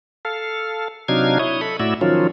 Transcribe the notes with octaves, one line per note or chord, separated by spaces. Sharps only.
A4 F5
C3 F#3 D4 D#4 F5 G#6
E4 C#5 D#6
A4 B5
A2 E4 F#4 D5 E6
D#3 F3 F#3 C#4 F4